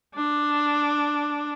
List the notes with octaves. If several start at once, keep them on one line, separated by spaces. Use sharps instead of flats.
D4